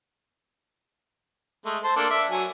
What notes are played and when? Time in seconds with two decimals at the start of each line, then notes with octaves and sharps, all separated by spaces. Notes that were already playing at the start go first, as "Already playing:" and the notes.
1.65 G#3 A3
1.84 C5 A5 C6
1.96 A#3 D4 A4
2.10 D5 E5
2.31 F#3 G#5